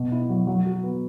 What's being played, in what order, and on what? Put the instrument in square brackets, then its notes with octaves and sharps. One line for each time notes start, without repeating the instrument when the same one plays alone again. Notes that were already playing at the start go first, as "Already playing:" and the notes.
Already playing: [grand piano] B2
E4
F#3
F#3
F#4
B3